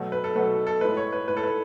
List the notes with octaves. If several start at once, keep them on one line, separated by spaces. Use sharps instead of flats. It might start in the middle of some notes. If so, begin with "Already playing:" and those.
Already playing: B2 F#3 A3
B4
A4
B2 F#3 A3 B4
A4
A2 G#3 B4
C#5
B4
A2 G#3 B4
A4
B4